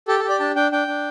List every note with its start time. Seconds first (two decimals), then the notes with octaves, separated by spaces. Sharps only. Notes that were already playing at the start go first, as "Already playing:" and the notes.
0.08 G4 A4
0.19 A4
0.24 G4
0.29 D5
0.40 D4 A5
0.55 D4 G5
0.72 D4 G5
0.88 D4